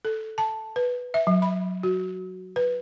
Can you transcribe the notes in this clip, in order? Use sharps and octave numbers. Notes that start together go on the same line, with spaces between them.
A4
A5
B4
E5
F#3
B5
F#4
B4